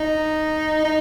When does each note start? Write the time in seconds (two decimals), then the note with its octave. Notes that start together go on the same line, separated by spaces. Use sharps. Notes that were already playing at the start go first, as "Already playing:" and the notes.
Already playing: D#4
0.85 D#4